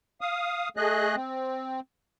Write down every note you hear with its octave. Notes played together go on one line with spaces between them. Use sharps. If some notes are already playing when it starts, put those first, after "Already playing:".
F5 D#6
A3 G#4 D#5 F#6
C4